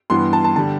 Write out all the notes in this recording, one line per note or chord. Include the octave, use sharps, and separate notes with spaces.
G2 E3 B3 C6
A5
A5
D3 G3 A5